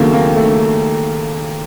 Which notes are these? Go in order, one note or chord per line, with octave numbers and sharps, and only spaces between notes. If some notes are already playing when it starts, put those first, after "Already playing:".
Already playing: D#2 C#3 F#3 A3 A#3
A#3
A3